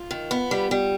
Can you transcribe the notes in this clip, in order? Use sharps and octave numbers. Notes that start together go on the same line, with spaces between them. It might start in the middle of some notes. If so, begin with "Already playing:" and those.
Already playing: F4
D#3
B3
G3
G3